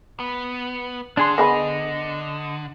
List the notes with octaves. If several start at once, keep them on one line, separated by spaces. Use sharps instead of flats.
B3
D3 D4 G#4 C6
B3 G#4 D#5 B5